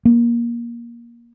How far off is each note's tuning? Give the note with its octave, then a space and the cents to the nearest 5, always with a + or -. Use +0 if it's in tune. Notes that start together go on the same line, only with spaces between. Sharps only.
A#3 +20